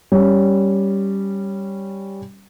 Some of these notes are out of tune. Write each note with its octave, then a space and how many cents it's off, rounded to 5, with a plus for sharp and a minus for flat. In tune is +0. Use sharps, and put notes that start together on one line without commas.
G3 +0 C#4 +0